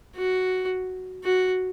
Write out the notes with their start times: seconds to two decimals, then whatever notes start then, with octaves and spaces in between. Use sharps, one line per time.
0.16 F#4
1.24 F#4